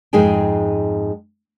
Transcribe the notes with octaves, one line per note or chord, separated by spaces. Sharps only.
F2 G#2 G#3 D#4 G#4 G5